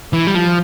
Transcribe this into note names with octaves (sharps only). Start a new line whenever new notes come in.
E3
G3
F3